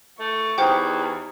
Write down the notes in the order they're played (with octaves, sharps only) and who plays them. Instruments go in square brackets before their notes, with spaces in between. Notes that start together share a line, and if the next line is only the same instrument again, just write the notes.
[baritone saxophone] A3 [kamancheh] C#6
[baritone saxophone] E2 [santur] D#4 G4 [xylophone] C5 F#5 G5